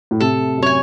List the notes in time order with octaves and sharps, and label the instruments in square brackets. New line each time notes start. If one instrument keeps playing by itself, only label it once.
[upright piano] A2
[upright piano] C3 [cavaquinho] A4
[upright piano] F#2
[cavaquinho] C#5 G#5